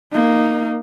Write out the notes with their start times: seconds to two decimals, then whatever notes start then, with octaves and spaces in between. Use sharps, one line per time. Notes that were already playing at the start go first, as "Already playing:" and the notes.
0.12 A#3 D#4